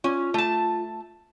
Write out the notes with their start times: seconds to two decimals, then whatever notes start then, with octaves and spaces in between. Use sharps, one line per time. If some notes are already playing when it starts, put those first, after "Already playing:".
0.04 C#4 F4
0.34 A3 A5